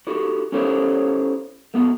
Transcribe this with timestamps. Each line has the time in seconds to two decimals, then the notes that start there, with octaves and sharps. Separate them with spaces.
0.07 E4 F#4 G4 A4
0.52 C#4 E4 G4 A4 C5 C#5
1.74 A3 B3 F#4